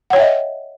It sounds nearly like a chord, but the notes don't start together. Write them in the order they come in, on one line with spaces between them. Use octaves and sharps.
F#5 C#5 G5 E5 D#5